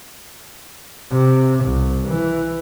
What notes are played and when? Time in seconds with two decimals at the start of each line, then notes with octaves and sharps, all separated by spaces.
1.11 C3
1.65 C2
2.08 E3